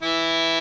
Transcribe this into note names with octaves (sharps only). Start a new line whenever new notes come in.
E3 E4